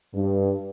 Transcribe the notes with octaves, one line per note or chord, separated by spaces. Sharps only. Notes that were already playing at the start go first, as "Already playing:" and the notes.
G2